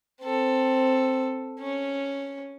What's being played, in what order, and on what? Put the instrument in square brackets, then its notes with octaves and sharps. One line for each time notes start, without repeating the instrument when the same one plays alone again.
[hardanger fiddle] C4 A4
C#4